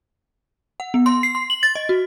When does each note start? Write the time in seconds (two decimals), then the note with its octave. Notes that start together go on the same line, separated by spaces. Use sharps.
0.80 F#5
0.94 B3
1.06 C6
1.23 C7
1.35 C6
1.50 F#7
1.63 A6
1.75 D#5
1.89 F#4